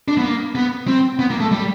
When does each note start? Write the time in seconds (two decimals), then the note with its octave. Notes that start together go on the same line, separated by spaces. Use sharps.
0.08 D4
0.18 B3
0.24 A#3
0.55 B3
0.87 C4
1.19 B3
1.30 A#3
1.40 A3
1.51 G3